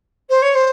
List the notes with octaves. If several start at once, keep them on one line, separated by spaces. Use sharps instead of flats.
C5
C#5
C5